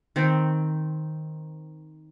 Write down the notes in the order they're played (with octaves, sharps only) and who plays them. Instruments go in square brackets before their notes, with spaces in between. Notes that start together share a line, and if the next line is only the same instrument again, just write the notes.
[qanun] D#3 C4